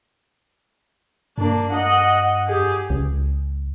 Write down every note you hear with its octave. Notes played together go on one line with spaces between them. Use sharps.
G2 A#3 D4
D#5 F#5
G4 G#4
C#2